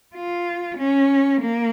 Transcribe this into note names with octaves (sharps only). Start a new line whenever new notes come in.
F4
C#4
A#3